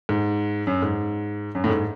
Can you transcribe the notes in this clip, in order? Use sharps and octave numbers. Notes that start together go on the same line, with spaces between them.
G#2
F#2
G#2
F#2
A2
G#2